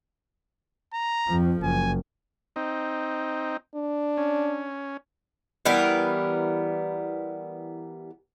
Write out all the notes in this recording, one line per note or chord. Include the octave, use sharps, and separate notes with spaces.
A#5
F2 F3
F#1 G#5
C4 D#4
D4
C#4
E3 G3 B3 A#4